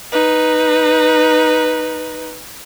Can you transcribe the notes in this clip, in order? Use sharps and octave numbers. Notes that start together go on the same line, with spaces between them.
D#4 B4